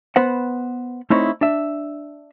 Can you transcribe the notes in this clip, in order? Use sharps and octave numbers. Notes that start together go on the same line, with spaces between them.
B3 B4 C5 F#5
A3 C4 D#4 E4 C#5
D4 E5